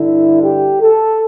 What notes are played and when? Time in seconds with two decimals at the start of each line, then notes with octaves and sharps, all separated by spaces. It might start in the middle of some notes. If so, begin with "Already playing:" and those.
Already playing: G2 D3 E4
0.41 G4
0.80 A4